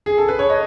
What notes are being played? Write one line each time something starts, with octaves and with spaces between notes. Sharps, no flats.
G#4
A4
B4
C#5
D#5